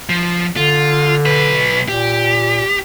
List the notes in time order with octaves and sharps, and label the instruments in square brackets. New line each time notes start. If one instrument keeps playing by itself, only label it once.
[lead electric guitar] F3
[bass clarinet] D3 [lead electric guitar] F4
[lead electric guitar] B1 B4
[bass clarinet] A#2 [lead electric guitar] G4